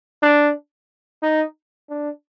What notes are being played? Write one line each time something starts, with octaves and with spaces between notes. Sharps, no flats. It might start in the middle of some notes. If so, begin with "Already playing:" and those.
D4
D#4
D4